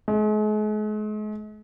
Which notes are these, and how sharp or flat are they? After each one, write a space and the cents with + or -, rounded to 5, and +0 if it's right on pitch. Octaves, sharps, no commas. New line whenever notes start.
G#3 +40